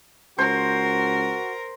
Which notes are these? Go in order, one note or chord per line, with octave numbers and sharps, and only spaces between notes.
C#2 F#4 A#4 C5